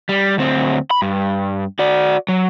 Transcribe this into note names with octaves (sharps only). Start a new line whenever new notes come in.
G3
D2 C4
B5
G2
F#4 D5
F#3